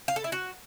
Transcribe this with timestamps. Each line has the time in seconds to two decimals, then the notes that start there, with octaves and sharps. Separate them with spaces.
0.08 F5
0.16 A4
0.24 E4
0.32 F#4